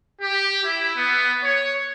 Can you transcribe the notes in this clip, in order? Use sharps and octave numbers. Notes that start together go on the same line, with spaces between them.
G4
E4
B3
C#5